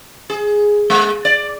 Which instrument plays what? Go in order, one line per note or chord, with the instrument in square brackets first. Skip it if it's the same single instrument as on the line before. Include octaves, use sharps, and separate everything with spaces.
[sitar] G#4
G#3
D5